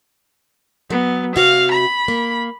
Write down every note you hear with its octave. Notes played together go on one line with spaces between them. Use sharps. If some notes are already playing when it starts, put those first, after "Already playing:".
F#3 B3
C3 F#4 F5
B5
A#3